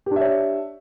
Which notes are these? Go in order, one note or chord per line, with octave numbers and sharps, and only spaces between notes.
D4 G4 C#5 E5